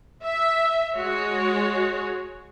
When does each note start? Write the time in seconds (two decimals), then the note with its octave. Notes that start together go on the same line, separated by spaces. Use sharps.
0.23 E5
0.95 G#3 F#4 C#5